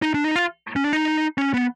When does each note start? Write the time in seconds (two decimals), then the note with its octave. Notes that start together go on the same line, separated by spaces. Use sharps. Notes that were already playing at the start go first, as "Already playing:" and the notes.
0.02 D#4
0.14 D4
0.24 D#4
0.36 F4
0.76 C#4
0.84 D4
0.93 D#4
1.38 C#4
1.54 B3